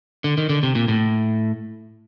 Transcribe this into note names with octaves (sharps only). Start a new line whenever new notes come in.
D3
D#3
D3
C3
A#2
A2